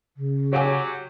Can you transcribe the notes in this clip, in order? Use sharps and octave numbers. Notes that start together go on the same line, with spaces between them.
C#3
F#3 G4 C#5 F#5 G#5